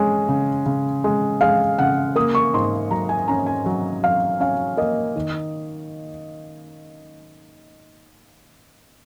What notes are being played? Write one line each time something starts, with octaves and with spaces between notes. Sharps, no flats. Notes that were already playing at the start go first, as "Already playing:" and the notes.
Already playing: G#3 C#4
C#3
C#3
G#3
G#3 F5
C#3 F#5
A#3 D#6
C#6
G#2 C6
F#3 A#5
G#5
C#4 A#5
G#5
F#3
F#3 F5
C#4 F5
A#3 D#5
D#3